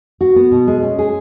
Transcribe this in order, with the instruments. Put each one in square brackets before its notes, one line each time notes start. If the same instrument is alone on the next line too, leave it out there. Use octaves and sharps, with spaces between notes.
[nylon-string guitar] F#4
B3
B2
G#3
C#4
G#4